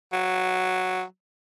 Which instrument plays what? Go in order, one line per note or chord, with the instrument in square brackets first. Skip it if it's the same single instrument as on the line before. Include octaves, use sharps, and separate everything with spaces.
[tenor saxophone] F#3